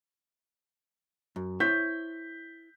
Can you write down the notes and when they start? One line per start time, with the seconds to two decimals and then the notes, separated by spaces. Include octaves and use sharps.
1.36 F#2
1.60 E4 C5 C#5 G6 B6